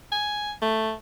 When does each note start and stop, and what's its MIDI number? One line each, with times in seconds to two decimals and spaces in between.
0.12 0.52 80
0.62 0.93 57